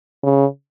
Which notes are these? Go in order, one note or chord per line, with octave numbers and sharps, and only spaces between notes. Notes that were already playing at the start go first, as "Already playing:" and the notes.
C#3